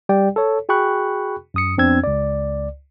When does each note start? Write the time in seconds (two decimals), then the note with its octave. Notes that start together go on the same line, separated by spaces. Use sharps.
0.09 G3 G4 D5 G5
0.36 A4 C#5
0.69 F#4 G#4 G5 B5 C#6 F#6
1.54 F#2 D#6 C#7
1.78 F2 B3 C4 D4 E6 G#6
2.04 C#2 D5